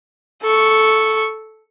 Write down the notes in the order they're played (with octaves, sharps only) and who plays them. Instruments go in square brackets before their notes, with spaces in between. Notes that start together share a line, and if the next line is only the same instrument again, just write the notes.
[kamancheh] A4 C#6